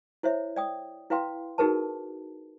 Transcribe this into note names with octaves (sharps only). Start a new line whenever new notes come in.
E4 C5 C#5 E5
D5 G5 D#6
E4 B4 F5 G5 C6
D#4 F#4 G#4 A#4 B4 A5